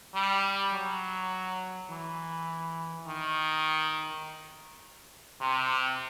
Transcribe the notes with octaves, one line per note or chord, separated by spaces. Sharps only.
G3
F#3
E3
D#3
C3